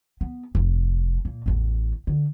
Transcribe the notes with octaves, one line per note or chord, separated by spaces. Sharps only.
B3
F1
A#2
A1 E2
D3